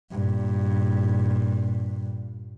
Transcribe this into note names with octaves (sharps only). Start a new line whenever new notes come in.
G2 A#2